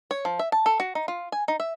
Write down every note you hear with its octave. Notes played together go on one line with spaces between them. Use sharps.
C#5
F3
E5
A5
A4
F#4
D#4
F4
G#5
D#4
E5